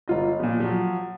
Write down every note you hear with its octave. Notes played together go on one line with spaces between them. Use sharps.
G1 F4 D#5
A#2 F3
F3 F#3